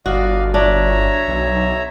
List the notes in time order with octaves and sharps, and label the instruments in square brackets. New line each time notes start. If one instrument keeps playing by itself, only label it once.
[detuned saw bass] G1 [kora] F#4 [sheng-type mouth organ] D5 D#5 F5
[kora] D4 [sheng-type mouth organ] C#5 E5 A#5
[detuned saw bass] B1